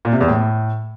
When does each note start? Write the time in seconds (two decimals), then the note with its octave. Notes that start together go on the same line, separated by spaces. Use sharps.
0.05 A#2
0.13 C3
0.21 E2
0.28 A2